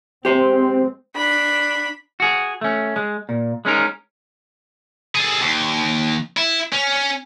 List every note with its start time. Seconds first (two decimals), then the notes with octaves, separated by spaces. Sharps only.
0.25 G#3 C4 G4 C5
1.16 D4 B5
2.20 F#4 G#4
2.61 A3 C#4
2.96 G#3
3.29 A#2
3.65 G#3 C#4 D#4 A#4
5.15 G#4 A4
5.41 D#2
6.37 E4
6.73 C#4